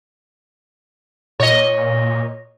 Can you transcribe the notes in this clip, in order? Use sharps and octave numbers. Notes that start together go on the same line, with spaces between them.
A#2 C#5 D#5